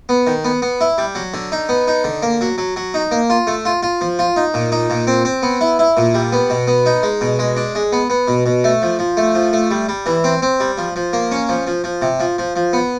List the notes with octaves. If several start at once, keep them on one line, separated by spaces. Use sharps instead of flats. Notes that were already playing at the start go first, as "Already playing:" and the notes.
B3
D#3
B3
B3
E4
G3
F#3
D3
D#4
B3
D#4
D3
A#3
F#3
F#3
F#3
D#4
A#3
F4
A3
F4
F4
F3
F4
D#4
A#2
D#4
A#2
C4
C4
B3
E4
E4
A#2
G3
B3
B2
B3
D#4
G#3
B2
G#3
D4
G#3
B3
B3
B2
B2
A3
F3
F3
A3
F3
A3
G3
G3
E3
C4
C4
G3
F3
F3
A#3
C#4
F3
F3
F3
C3
F3
F3
F3
B3